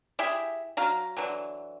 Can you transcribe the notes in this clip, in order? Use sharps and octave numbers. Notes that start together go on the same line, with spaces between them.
E4 G4 G#4 E5
F#3 F#4 F5 A#5
D3 E3 F#3